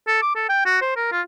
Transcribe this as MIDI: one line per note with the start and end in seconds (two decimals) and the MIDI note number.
0.07 0.20 69
0.22 0.34 86
0.35 0.46 69
0.49 0.65 79
0.66 0.79 66
0.81 0.96 72
0.96 1.09 70
1.12 1.21 65